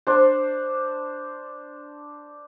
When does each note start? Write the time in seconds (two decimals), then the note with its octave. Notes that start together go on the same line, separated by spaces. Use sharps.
0.07 D4 C5